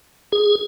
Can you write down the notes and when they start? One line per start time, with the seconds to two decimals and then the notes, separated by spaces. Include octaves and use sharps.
0.32 G#4